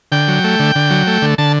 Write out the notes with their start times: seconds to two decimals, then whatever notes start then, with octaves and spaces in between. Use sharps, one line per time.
0.12 D3 G5
0.28 F#3
0.44 A3
0.59 D3
0.75 D3
0.90 F#3
1.07 A3
1.22 D3
1.38 D3 A5